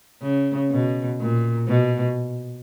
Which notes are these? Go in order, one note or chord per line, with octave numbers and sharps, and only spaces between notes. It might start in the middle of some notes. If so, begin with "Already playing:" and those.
C#3
B2
A#2
B2